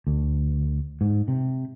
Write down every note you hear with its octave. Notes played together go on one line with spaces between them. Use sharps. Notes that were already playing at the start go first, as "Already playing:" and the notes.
D2
G#2
C3